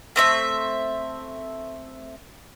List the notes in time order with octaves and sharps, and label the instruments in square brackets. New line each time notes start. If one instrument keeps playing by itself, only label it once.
[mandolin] A3 C4 E5